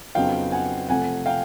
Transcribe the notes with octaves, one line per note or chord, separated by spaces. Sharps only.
F2 C#3 F#3 B3 D#4 F5 G5
F#5 G#5
C3 F3 A3 C4 F#5 G#5
F5 G5